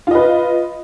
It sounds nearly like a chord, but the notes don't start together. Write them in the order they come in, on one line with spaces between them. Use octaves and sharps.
F4 D#5 B4